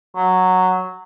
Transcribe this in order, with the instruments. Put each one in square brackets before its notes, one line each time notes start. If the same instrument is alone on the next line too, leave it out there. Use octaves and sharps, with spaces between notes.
[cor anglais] F#3